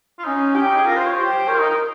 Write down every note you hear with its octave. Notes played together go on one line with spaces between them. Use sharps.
F4
C#4 D#4
C#4 G4
D#4
G#4
F4 A#4
C5
C#5
G4 C5
A#4 C#5
F4
D#4
D#4